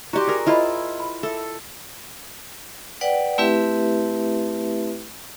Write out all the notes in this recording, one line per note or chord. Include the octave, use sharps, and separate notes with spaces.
E4 F#4 G4 D5 C6
G#4 A#4 D5
E4 F4 C5 D#5 B5
B5
A4 E5 D6 E6
B4 D5 F#5 G5
A3 C4 E4 G4 B4 E5